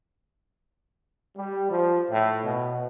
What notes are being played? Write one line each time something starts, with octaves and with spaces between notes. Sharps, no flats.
G3
F3
A2
B2